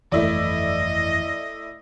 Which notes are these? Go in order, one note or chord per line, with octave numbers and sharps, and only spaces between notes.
G1 F2 E3 A3 E4 D5 D#5